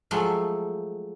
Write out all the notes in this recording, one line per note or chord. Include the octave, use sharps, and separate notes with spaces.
F3 F#3 G#3 A3